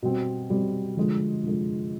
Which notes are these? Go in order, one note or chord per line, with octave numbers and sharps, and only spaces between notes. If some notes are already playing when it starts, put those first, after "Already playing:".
B2 G3 C4
B2 G3 C4
D3 F3 G#3
D3 F3 G#3